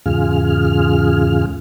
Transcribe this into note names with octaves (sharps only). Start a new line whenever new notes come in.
E2 G#2 C#3 F4 G#4 F6